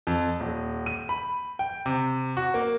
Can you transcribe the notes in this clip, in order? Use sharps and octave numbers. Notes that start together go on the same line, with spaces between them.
F2
D#1
D#7
B5
G5
C3
F#4
A#3